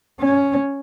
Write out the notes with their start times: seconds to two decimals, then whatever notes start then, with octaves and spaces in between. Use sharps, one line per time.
0.20 C#4